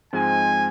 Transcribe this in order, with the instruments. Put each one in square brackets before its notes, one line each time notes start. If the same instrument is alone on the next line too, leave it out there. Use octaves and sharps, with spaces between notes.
[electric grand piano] G#2 F3 G#3 C4 [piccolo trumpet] G#5